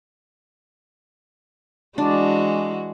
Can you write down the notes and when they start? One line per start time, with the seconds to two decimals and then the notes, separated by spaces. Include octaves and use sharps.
1.98 E3 G#3 D4 F#4